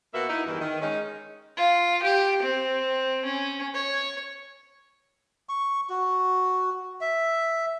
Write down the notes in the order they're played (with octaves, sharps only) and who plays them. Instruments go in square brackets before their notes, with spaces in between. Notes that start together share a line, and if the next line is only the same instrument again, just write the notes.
[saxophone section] B2 A#3 F#4 B4 E5
D#4 E4
E2 G2 D#3 E3
D#3
G#3 C#4 D#4
[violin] F4
G4
C4
C#4
C#5
[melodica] C#6
F#4
E5